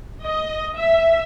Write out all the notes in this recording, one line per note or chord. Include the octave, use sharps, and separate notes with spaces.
D#5
E5